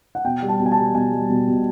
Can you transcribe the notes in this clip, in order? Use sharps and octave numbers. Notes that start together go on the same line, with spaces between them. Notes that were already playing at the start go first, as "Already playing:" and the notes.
F#5
B2 G5
G3
A5
B2
G#5
A5
G3
B2 G#5
G3
B2
B2